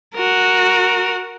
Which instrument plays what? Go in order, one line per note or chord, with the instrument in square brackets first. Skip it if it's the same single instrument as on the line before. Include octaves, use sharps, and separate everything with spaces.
[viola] F#4 A#4